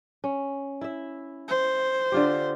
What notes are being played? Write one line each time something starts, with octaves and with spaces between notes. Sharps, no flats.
C#4
E4 E5
C5
D3 F4 G4